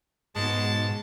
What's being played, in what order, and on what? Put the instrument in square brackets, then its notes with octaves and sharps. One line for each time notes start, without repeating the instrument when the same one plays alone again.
[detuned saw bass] G#2 [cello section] B2 [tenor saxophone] G#3 [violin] A5